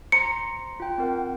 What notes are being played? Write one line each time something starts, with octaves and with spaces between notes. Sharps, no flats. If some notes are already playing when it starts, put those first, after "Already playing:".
C5 A#5 C6 C#7
F4 G5
C4 A#4 F#5